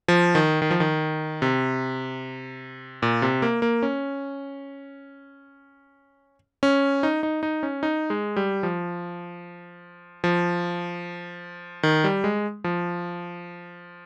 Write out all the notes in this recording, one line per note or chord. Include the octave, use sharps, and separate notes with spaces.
F3
D#3
D#3
F3
D#3
C3
A#2
C3
A#3
A#3
C#4
C#4
D#4
D#4
D#4
C#4
D#4
G#3
G3
F3
F3
D#3
G3
G#3
F3